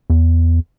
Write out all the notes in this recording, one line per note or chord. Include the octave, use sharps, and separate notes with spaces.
E2